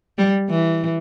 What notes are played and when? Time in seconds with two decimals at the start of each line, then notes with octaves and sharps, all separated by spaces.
0.18 G3
0.49 E3